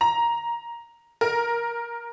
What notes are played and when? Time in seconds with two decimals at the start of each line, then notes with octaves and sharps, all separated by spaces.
0.01 A#5
1.21 A#4